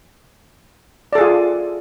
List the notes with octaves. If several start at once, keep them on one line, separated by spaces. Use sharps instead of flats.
F4 G#4 A4 D5